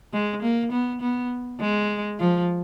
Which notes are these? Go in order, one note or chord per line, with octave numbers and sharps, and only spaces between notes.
G#3
A#3
B3
B3
G#3
F3